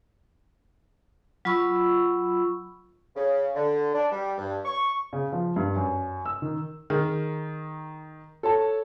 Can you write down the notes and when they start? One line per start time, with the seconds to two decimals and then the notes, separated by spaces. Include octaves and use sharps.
1.45 F#3 F4 B5 C#6 E6
3.16 C#3
3.55 D3
3.93 D4
4.10 G3
4.38 G2
4.64 C#6
5.13 C#3
5.33 F3
5.56 G2
5.76 F#2
6.26 E6
6.42 D#3
6.90 D#3 G#4
8.43 A4 C#5 A5